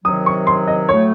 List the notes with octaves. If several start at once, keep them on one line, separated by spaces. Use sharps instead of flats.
C3 D#3 F#3 D#6
C#6
C6
D#5
A2 F#3 A3 C#5